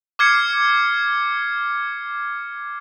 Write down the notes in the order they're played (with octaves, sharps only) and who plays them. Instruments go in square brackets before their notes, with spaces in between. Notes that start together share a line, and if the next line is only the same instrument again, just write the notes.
[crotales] D6 F6 G#6 C7 C#7